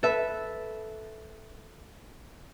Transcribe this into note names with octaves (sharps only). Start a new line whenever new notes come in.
A4 B4 E5